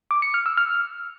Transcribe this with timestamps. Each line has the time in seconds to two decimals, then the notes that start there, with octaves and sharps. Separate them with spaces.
0.11 D6
0.22 C#7
0.34 F6
0.46 E6
0.57 F6